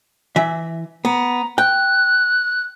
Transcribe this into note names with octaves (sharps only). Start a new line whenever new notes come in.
E3 E5
B3 A#5
G5 F#6